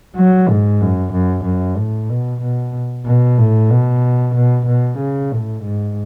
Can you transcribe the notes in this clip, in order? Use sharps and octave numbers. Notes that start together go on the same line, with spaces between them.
F#3
G#2
F#2
F#2
F#2
A2
B2
B2
B2
A2
B2
B2
B2
C#3
A2
G#2